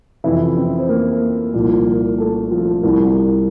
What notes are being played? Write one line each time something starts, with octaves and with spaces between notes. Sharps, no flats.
F2 C3 E3 E4 E5
C4 C5
C5
A#3 A#4
C2 A#2 F3
A3 A4
F3 F4
C2 C3 G3